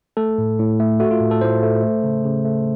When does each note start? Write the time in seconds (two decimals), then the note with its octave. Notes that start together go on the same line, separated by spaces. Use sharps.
0.17 A3 A4
0.38 A2
0.59 A2
0.80 A3
1.00 A3 F#4
1.11 F4
1.20 A2
1.31 A4
1.41 A2 C5
1.63 A3
1.83 A3
2.04 C#3
2.24 C#3
2.45 A3